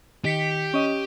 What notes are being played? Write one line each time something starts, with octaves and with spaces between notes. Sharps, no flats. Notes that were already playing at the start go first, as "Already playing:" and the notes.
D#3 G4 B6 C#7
C#4 D#5